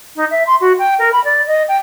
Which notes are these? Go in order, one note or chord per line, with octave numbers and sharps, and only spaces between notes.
D#4
E5
C6
F#4
G5
A#4
B5
D5
D#5
G5